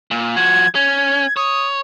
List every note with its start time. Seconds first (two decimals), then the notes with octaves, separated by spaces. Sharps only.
0.11 A#2
0.36 F3 F#4 G#6
0.75 C#4 G#6
1.37 C#5 D#6